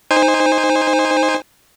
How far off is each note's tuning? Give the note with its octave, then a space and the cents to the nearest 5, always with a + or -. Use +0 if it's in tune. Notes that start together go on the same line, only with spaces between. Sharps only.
D#4 +0 C5 +0 G#5 -25